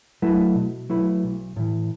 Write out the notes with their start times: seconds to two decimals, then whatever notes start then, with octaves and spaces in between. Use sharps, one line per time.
0.22 F#3 A3 E4 B4
0.55 B2
0.90 F#3 A3 E4 B4
1.23 B1
1.56 A2 E3